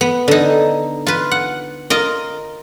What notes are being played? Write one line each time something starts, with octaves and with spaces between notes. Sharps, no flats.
B3
D3 D#4
F4 B4
F#5
F4 A#4 D#5